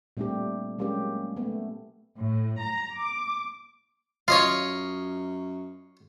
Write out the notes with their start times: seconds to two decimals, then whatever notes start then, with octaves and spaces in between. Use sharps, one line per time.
0.17 A#2 G3 A3 C4 D4 G4
0.78 F#3 G#3 A#3 C#4 G4
1.36 A3 B3
2.18 A2
2.60 A#5
2.96 D6
4.28 F#2 F4 C#5 D#5 F5